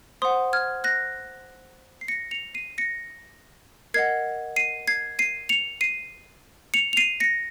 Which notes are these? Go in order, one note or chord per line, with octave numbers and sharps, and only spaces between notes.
C5 F#5 C6 D#6
F6 G#6
F#6 A#6
C7
A#6 C#7
C#7 F7
C7 D#7
A#6 C#7
A#4 D#5 F#5 G#6 C7
C7 D#7
G#6 C7
C7 D#7
C#7 F7
C7 D#7
C#7 F7
F7
C7 D#7
A#6 C#7